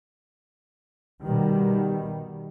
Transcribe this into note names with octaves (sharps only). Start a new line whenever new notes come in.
B2 D#3 G3